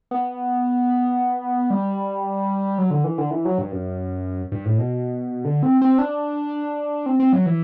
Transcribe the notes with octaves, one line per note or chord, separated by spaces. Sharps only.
B3
G3
F#3
D3
E3
D3
E3
F#3
G2
F#2
G2
A2
B2
D3
C4
C4
D4
C4
C4
F#3
E3